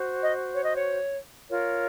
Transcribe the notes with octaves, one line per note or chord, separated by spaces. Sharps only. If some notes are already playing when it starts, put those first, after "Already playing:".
Already playing: F#4 C5
D#5
C#5
D#5
C#5
F4 A#4 C#5